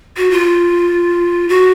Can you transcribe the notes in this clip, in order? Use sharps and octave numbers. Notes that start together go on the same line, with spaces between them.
F#4
F4
F#4